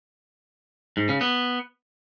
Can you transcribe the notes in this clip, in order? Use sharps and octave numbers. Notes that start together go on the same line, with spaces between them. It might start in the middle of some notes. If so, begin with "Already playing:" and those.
G#2
C#3
B3